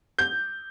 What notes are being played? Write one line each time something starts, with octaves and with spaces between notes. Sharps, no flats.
G6